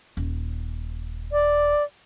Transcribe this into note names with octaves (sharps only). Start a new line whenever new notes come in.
D#1
D5